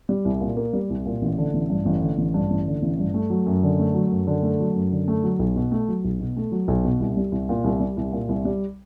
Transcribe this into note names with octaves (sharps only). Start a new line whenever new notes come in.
G3
C2
A#2
A#3
G3
C2
A#2
A1
D3
A1
G2
A1
D3
A1
G2
A1
D3
A1
G2
A3
F#3
F#2
D3
A3
F#3
F#2
D3
A3
F#3
F#2
D3
A3
F#3
B1
B2
A3
F#3
B1
B2
A3
F#3
B1
B2
C2
G3
C2
A#2
C2
G3
C2
A#2
C2
G3